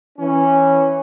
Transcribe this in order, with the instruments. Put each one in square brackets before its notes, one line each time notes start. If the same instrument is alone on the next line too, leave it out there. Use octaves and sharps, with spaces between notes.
[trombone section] E3 C#4